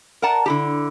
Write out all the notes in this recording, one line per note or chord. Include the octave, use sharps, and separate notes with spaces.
A#4 D5 F#5 A5 A#5
D3 E4 G4